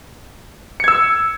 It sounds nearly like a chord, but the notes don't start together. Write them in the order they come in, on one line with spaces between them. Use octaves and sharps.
C#7 G#6 E6